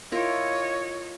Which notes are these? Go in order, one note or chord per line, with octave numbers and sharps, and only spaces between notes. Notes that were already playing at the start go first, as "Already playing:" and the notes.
E4 F4 A#4 C#5 D#5